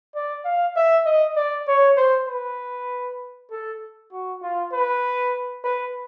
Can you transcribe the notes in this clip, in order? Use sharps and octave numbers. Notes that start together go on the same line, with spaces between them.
D5
F5
E5
D#5
D5
C#5
C5
B4
A4
F#4
F4
B4
B4